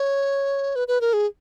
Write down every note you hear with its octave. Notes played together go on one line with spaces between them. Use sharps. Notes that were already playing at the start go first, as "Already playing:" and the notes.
Already playing: C#5
B4
B4
A#4
G#4